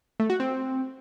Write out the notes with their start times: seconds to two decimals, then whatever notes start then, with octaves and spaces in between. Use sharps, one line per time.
0.20 A3
0.30 F#4
0.40 C4